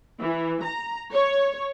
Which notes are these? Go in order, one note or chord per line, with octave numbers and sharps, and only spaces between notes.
E3
A#5
C#5